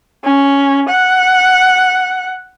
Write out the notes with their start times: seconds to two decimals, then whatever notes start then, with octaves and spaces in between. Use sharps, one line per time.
0.25 C#4
0.89 F#5